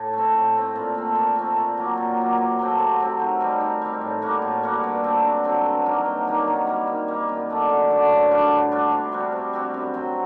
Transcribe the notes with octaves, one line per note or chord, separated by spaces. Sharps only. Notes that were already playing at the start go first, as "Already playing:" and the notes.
Already playing: A2
A3 C4
A2
A3 C4
A#2
A3 C4
A#2
A3 C4
A#2
F#3 A#3
A#2
F#3 A#3
C3
F#3 A3 C4
C3
F#3 A3 C4
D#3
G3 C4
D#3
G3 C4
A2
G3 A#3 F#4
A2
G3 A#3 F#4
G2
F#3 A3 C4
G2
F#3 A3 C4
G2
D#3 F#3 A#3
G2
D#3 F#3 A#3
D#3
G3 A#3
D#3
G3 A#3
F#2
D3 A3 D4
F#2
D3 A3 D4
A2
G3 D4 F#4
A2
G3 D4 F#4
C3
G3 C4 F#4
C3
G3 C4 F#4
F#2
F#3 C4